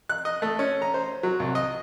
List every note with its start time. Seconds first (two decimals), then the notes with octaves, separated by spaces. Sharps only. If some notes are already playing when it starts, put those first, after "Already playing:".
0.09 F#6
0.25 D#5
0.42 A3
0.59 C#4
0.82 A#5
0.94 C5
1.23 F#3
1.40 C2
1.55 D#5